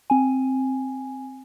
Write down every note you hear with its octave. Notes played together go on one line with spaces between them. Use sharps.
C4 G#5